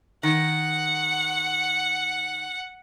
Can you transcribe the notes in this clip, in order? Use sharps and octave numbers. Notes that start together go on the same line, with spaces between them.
D#3 F#5